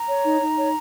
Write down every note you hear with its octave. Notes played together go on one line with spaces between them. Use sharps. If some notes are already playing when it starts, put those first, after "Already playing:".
Already playing: A#5
C#5
D#4
D#4
C#5